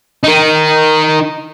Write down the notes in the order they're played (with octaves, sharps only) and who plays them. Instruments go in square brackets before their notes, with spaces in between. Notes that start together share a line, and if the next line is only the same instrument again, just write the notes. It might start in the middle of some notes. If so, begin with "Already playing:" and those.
[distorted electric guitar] D#4 A#4